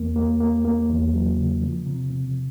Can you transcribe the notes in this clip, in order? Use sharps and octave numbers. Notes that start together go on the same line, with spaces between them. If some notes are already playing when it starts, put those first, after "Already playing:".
Already playing: E2 A#3
A#3
A#3
A#3
E2
F#3
C#3
F3
C3
C3